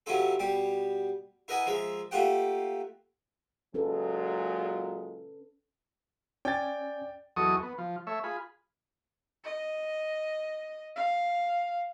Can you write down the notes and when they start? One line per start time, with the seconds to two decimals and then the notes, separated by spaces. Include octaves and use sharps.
0.06 C3 F#3 C#4 E4 F4 A4
0.39 B2 G3 G4
1.48 E4 A#4 B4 D#5 F#5 G#5
1.66 F3 G#3 A#4 E5
2.11 A3 A#3 F4 G4 F#5 G5
3.74 A#2 F#3 G#3 C#4 A4 B4
6.45 C#4 D5 G5 G#5 A6
7.36 E2 F#3 A4 D#5 C#6 D#6
7.63 B3
7.78 F3
8.07 A3 C#5 E5
8.24 F4 G#4 B5
9.44 D#5
10.96 F5